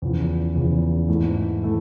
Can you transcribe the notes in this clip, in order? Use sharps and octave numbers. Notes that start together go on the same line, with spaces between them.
E2 C#3 F3
E2 C#3 F3
G#2 E3 A3
E3 A3